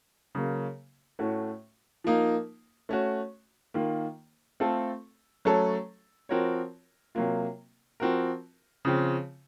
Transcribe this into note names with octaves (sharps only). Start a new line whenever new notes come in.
C#3 F#3 A#3
A2 A3 C#4 F#4
F3 A#3 D#4
A3 C#4 F#4
D#3 A#3 F4
A3 C4 F4 A4
F#3 A3 C#4 A4
F3 C4 F#4 A#4 C#5
C3 F#3 A#3 F4
F3 C4 F#4 A#4
C#3 F3 C4